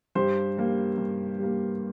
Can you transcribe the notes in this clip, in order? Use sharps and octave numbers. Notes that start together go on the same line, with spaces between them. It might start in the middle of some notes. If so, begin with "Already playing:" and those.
G2 G4 C5
G3 A#3
G2
G3 A#3